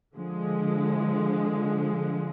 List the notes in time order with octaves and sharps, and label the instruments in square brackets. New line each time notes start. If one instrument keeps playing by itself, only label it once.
[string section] D3 F3 G#3